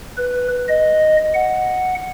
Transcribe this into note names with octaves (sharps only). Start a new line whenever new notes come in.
B4
D#5
F#5